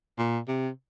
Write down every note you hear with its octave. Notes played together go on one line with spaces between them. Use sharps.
A#2
C3